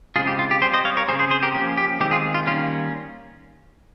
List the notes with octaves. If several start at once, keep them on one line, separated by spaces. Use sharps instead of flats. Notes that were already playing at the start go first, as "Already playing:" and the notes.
C#3 G#3 C4 F4 G#4
G4
F4
G4
G3 C4 G#4 C5
C5 D#5
C#5 F5
A#4 C#5
C#3 G3 C4 G#4 C5
G#4 C5
G#4 C5
G4 A#4
F3 A#3 C#4 G4
G4
D#3 G#3 C4 G4
F4 G#4
F4
D#3 G3 A#3 C#4 F4